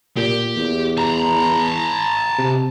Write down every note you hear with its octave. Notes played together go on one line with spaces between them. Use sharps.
A#2 G4
E2
A5 A#5
C3